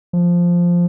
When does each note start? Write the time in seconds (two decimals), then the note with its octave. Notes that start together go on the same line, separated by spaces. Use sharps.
0.13 F3